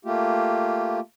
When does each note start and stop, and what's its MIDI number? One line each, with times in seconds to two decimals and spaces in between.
0.05 1.00 57
0.05 1.00 58
0.05 1.00 65
0.05 1.00 67